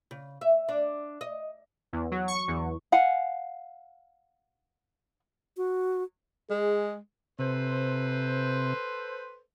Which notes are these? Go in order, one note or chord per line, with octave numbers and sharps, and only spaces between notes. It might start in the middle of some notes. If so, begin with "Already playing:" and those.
C#3
E5
D4
D#5
E2
F#3
C#6
E2
F5 F#5 G#5
F#4
G#3 G#4
C3 A4 B4 C5